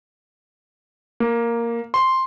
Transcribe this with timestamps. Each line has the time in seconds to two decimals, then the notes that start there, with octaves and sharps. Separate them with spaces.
1.20 A#3
1.94 C6